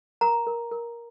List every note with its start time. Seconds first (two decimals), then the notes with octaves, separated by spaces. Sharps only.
0.21 A#4 A#5
0.47 A#4
0.71 A#4